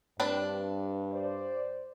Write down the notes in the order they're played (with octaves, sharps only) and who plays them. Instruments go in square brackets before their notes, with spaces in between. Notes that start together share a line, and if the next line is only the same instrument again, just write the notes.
[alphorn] G2 [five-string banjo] C4 D4 B4
[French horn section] C5 D5